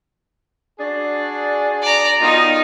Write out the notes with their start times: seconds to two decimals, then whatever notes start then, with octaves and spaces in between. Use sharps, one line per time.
0.79 D4 F#4 G#4
1.82 D5 A#5
2.21 B2 D#3 D#4 F4 D#5